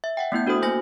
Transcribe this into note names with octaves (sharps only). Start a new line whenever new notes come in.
E5
E5 F#5 G5
A3 B3 E4 G6
D4 F#4 A4 C5 D#6
A#3 C5 G#5 A#6